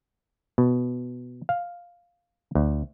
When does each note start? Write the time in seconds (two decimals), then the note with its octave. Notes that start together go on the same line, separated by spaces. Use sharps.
0.58 B2
1.49 F5
2.55 D2